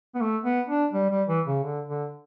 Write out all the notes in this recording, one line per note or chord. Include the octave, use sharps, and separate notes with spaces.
B3
A3
B3
D4
G3
G3
E3
C#3
D3
D3